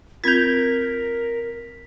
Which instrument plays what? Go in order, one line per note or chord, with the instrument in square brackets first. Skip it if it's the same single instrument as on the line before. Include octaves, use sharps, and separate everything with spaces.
[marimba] C4 F4 [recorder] A#4 [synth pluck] G6 G#6 [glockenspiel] B6 F7